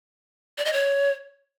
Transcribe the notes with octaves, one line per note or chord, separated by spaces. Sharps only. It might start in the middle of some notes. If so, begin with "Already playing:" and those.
D5
D#5
C#5